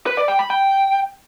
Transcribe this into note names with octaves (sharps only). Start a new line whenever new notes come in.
B4
D5
G5
B5
G5